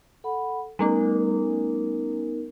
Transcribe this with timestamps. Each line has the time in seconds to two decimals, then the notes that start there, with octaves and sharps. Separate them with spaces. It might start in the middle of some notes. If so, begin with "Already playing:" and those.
0.24 A4 F#5 B5
0.79 G3 A3 B3 C#4 D#4 A#4